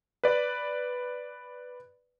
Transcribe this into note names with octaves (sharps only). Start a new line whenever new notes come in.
B4 D5